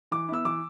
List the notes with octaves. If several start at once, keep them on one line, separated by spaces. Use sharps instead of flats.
E3 D6
B3 E4 E6
E3 D6